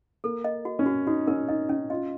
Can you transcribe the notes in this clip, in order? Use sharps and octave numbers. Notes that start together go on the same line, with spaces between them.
A#3 A4
D#5
F#4
C#4
F#4
D#4 F#4
C#4 A#4
D#4 D#5
C#4 D#4
F4 D#5